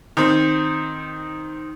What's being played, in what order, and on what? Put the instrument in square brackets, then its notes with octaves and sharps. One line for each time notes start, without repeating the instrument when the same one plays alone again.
[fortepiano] D#3 C4